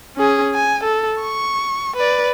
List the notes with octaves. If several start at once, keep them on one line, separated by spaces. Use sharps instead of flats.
C#4 G#4
G#5
A4
C#6
B4 D5